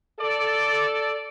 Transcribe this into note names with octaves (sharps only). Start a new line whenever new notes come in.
A4 D5